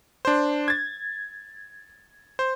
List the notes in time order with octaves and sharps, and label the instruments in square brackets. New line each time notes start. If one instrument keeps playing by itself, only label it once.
[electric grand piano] D4 C5
G#6 A6
C5